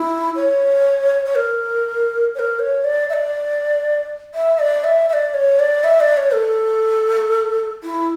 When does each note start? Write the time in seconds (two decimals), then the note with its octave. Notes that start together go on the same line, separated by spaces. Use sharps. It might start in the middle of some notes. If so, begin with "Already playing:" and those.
Already playing: E4
0.36 C#5
1.25 C#5
1.35 A#4
2.35 C#5
2.39 A#4
2.59 C#5
2.84 D5
3.09 E5
3.13 D5
4.34 E5
4.59 D5
4.84 E5
5.09 E5
5.13 D5
5.34 C#5
5.59 D5
5.84 E5
6.00 D5
6.17 C#5
6.34 A4
7.83 E4